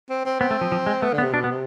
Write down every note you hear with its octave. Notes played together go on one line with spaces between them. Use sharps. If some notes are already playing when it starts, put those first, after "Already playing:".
C4
C4
B3 C4
A3
F3
F3
G#3
A3 B3
D3
B3
C3
B2 D4
B3
C3